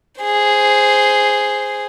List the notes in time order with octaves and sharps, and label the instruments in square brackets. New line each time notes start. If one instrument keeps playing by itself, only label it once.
[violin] G#4 C5